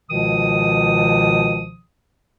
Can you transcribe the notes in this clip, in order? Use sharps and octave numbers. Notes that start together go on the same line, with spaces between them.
C#2 B2 D#3 F3 D#6